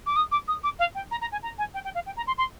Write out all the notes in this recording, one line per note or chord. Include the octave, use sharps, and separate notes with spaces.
D6
D#6
D6
D#6
D6
F5
G5
A#5
A#5
G#5
A#5
G#5
G5
G5
F5
G5
A#5
C6
C6